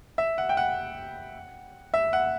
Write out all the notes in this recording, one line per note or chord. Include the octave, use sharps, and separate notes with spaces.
E5
F#5
G5
F#5
E5
F#5